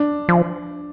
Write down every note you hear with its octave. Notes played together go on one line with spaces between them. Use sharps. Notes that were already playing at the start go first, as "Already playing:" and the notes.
Already playing: D4
F3